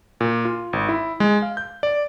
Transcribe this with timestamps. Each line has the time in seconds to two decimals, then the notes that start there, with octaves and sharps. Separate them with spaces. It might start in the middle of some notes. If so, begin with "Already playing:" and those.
0.21 A#2
0.45 F4
0.73 G#1
0.89 E4
1.20 G#3
1.42 F5
1.57 G6
1.83 D5